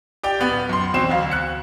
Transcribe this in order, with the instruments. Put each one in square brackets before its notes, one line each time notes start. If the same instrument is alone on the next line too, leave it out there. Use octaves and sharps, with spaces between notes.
[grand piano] G4 D5 G5
D1 B3
F#2 C6
E2 B2 C4 E7
D2 F5
F#6 C#7